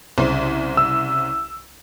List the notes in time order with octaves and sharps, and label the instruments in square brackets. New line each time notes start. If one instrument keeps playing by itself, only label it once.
[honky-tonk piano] C2 C#3 C5
[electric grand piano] E6